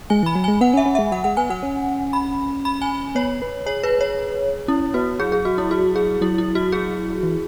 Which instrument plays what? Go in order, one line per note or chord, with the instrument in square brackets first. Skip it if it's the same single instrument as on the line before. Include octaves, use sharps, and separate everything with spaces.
[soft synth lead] G#3 [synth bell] G#5
[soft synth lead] E3 [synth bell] B5
[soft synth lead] F#3
[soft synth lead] G#3 [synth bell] G#5
[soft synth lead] B3 [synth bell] F#5
[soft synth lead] C#4
[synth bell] E5
[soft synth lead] C#4
[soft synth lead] G#3 [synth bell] E5
[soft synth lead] F#3 [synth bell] F#5
[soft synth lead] G#3 [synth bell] F#5
[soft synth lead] B3 [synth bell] G#5
[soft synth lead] F#3 [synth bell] F#5
[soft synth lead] C#4
[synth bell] B5
B5
G#5
[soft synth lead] B3 [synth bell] C#5
[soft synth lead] B4
[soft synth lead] G#4 [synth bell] C#5
[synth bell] B4
C#5
[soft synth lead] C#4 [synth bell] E4
[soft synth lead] B3 [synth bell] F#4
[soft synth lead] F#3 [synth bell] G#4
[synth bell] G#4
F#4
E4
F#4
G#4
[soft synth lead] F#3 [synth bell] E4
[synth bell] E4
F#4
G#4
[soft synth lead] E3